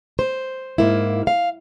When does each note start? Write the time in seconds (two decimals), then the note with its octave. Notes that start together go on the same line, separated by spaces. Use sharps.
0.19 C5
0.78 G#2 A#3 E4
1.27 F5